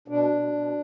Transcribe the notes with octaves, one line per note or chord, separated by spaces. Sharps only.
B2 D4
B2
B2